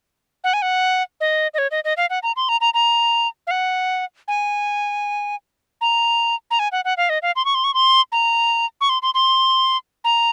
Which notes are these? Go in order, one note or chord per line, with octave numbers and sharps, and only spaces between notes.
F#5
G#5
F#5
D#5
D#5
C#5
D#5
D#5
F5
F#5
A#5
C6
A#5
A#5
A#5
F5
F#5
G#5
A#5
A#5
G#5
F#5
F#5
F5
D#5
F5
C6
C#6
C6
C#6
C6
A#5
C#6
C6
C6
C6
A#5